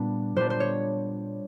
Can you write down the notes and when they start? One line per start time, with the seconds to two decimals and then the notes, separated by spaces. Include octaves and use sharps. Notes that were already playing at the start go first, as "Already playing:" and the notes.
Already playing: A#2 G3 B3 D4
0.36 A#2 G3 B3 D4 C5
0.50 C5
0.60 C#5